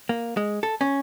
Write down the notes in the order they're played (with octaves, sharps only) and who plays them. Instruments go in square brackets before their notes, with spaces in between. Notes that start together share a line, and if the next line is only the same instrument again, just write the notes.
[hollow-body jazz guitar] A#3
G#3
A4
C#4